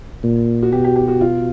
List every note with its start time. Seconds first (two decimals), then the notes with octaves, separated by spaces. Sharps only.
0.23 A#2
0.63 F#4
0.72 B2 G4
0.84 G4
0.96 G4
1.08 F#4
1.21 F4